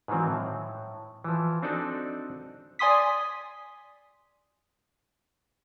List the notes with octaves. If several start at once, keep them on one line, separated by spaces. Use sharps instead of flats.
G#2 D#3 E3 F#3 C4
A2
E3 F3
C4 D4 D#4 F#4 A4 D5
D5 G#5 C6 D#6 B6